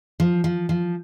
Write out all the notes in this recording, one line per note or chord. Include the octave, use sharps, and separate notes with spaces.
F3
F3
F3